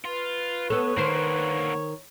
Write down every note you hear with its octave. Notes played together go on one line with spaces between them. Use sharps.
F4 B4
B3 A4 C#5
D3 D#3 A#3 C5